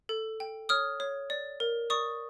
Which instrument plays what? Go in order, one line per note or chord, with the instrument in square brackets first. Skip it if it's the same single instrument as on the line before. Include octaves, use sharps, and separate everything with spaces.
[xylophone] A4
G5
C#5 D#6 F6
C#5
D5
A#4
D5 C#6 D#6